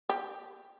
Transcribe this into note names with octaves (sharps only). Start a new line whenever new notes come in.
G4